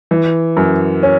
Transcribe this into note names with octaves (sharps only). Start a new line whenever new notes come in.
E3
F#2
C#4